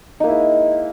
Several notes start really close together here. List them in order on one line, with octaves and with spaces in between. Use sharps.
D#4 A#3 E4 G#3